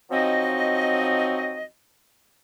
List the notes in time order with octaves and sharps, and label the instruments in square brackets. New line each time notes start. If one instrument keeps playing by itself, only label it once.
[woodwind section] F3 F#3 C4 D#4 F#4 D#5